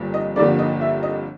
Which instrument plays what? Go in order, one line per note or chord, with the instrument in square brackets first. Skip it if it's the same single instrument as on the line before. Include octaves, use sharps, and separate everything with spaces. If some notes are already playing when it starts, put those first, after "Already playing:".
Already playing: [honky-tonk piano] G1 F2 G3 A#3
D#5
G1 F2 D3 G3 A#3 D5
D#5
E5
D#5